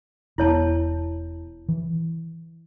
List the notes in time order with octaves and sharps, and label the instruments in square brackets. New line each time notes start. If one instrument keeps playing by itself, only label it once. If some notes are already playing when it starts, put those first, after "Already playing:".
[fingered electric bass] E1 B3 [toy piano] E4 C#5 A5
[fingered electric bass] E3